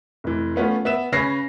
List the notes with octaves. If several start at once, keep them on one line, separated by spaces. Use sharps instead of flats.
F1 E3
A3 B3 C#4 F4
B3 E5 E7
C#3 C#4 B4 A#6 C7